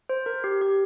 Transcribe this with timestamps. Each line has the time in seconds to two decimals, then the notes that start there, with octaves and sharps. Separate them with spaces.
0.09 C5
0.26 A#4
0.44 G4
0.62 G4